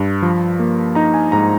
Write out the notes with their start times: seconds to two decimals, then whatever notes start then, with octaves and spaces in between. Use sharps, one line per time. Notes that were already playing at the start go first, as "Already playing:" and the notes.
Already playing: G2
0.22 F3
0.60 A#3
0.95 D#4 A#5
1.14 G#5
1.32 G#2 A#5